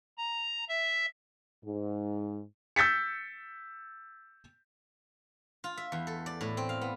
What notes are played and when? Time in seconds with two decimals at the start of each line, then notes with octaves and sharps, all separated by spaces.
0.18 A#5
0.69 E5
1.64 G#2
2.76 E6 G6 A6 B6 C#7
5.64 F4
5.77 E5
5.92 E2
6.07 A4
6.26 D5
6.41 A2
6.57 C4
6.69 F5
6.81 B3